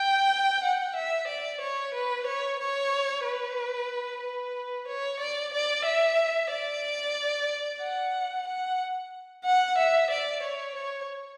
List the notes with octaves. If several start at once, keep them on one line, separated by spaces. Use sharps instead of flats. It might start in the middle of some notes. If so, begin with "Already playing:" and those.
Already playing: G5
F#5
E5
D5
C#5
B4
C#5
C#5
B4
B4
C#5
D5
D5
E5
D5
F#5
F#5
F#5
E5
D5
C#5
C#5